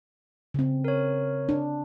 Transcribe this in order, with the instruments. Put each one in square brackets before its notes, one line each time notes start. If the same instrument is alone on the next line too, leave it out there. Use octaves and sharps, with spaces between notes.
[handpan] C#3 C4
[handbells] A#4 C#5
[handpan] D4